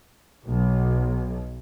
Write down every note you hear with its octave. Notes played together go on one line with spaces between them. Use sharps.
B1